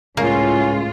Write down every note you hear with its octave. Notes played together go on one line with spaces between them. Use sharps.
C#2 A2 A#3 C#4 F4